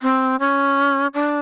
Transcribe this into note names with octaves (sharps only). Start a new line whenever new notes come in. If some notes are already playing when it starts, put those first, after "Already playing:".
C4
C#4
D4